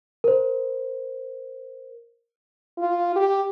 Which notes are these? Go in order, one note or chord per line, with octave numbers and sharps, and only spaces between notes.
A#4 C5
F4
G4